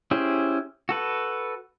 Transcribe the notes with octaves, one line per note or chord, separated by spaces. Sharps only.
C#4 E4 G4 G#4 C5
F#4 A4 B4